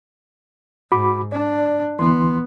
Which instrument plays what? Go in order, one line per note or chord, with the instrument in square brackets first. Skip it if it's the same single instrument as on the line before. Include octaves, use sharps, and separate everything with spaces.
[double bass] G#2 [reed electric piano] F#4 B5 D6
[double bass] D4 [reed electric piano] D5
[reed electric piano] D2 E3 C6 [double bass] B3